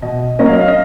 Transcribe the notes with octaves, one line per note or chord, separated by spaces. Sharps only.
B2 D#5
F#3 A#3 C#4 D#5
F5
D#5
F5
D#5